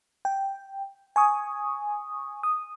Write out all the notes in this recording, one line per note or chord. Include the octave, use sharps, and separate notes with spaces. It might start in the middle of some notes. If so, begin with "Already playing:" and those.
G5
G#5 C#6 D#6
D#6